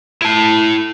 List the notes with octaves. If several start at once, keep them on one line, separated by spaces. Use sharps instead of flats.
E4 A5